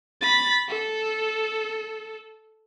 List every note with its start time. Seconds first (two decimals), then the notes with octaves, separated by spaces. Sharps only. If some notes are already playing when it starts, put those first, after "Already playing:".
0.21 B5 A6
0.68 A4